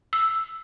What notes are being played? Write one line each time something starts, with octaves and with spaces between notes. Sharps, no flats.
E6